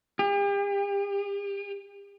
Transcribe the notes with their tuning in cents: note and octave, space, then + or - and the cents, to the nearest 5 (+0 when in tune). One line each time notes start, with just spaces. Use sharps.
G4 +40